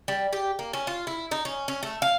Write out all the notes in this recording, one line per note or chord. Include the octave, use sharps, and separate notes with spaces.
G3
G4
A#3
C#4
F4
E4
D#4
C#4
C#4
A3
F5